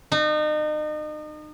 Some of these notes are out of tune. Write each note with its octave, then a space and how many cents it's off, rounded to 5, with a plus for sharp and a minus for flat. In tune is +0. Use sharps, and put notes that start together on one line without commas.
D#4 -35